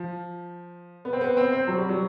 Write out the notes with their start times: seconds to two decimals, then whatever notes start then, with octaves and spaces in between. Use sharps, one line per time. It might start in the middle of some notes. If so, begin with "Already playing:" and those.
Already playing: F3
1.05 B3
1.13 C4
1.21 B3
1.37 C4
1.52 C4
1.68 F#3
1.78 G3
1.89 F#3